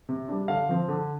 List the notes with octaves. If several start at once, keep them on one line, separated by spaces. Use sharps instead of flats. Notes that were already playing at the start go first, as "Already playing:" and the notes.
C3
G3 D4
D3 F5
F3 C4
D3